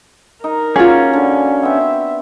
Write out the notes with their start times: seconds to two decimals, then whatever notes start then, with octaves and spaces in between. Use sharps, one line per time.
0.44 D#4 A#4
0.76 A#3 C#4 F4 F#4 G#4
1.13 D3 D4
1.63 B3 C4 E5